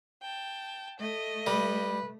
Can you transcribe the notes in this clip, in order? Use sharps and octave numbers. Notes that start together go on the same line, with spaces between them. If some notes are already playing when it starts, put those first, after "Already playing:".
G5 A5
A3 D#5
G3 B4